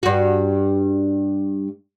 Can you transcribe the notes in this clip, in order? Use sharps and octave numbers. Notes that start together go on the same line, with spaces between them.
G2 F#4